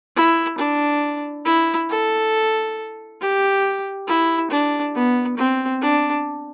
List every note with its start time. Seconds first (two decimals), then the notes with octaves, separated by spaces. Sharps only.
0.16 E4
0.58 D4
1.46 E4
1.90 A4
3.21 G4
4.08 E4
4.51 D4
4.95 B3
5.37 C4
5.82 D4